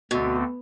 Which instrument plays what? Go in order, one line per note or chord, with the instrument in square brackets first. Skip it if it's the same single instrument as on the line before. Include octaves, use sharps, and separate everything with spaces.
[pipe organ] D2 D3 A3 C4 [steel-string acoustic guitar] B2